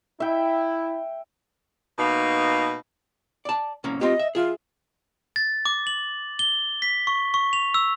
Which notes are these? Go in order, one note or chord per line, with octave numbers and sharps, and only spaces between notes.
E4 E5 G5
B2 A#3 D#4
D5 A5
C2 A#3 C#4
C4 F4 G4 D#5
E5
F4 G#4 E5
A6
D6
F#7
G7
B6
C#6
C#6
F7
E6